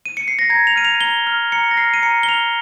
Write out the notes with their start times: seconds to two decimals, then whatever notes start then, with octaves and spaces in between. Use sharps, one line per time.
0.06 D#7
0.17 C#7
0.28 C7
0.39 A#6
0.50 A#5 G#6
0.67 F7
0.76 F6 D#7
0.85 F7
1.01 A#5 G7
1.27 F6
1.52 A#5 C#7
1.71 A#6
1.77 F6 C7
1.94 D#7
2.03 A#5 C#7
2.23 G7
2.28 F6 F7